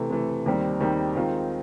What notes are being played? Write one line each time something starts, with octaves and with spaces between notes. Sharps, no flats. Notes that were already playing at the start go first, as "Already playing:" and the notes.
Already playing: C3 E3 A3
C3 E3 A3
D#2 D#3 G3 C4
D#2 D#3 G3 C4
D#3 G#3 C4 F4